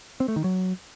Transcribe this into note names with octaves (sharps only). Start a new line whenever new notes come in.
C4
A3
D#3
F#3